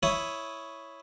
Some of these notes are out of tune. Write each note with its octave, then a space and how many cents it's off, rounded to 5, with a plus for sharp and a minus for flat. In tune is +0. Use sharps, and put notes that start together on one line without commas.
E4 +0 C#5 +0 D#6 +0